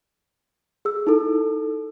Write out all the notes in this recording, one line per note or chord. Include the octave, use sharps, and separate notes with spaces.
G#4 E6
D#4 E4 A4